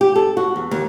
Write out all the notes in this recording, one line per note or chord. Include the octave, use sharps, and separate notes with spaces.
G4
A4
F#4
E2
D#2